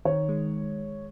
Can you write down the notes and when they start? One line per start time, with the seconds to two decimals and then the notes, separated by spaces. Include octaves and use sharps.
0.05 D#3 C#5
0.29 G#3